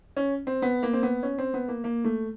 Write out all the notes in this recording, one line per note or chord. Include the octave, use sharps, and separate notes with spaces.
C#4
C4
B3
A#3
C4
B3
C#4
C4
B3
A#3
A#3
A3